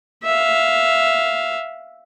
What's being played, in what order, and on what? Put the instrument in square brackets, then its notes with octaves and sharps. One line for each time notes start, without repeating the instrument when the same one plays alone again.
[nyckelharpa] E5 F5